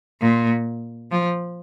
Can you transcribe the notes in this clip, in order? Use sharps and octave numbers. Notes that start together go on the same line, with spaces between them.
A#2
F3